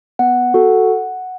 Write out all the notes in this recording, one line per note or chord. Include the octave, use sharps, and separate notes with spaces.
B3 F#5
F#4 A4